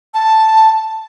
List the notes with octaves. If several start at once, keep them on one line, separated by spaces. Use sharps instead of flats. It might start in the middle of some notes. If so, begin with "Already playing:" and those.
A5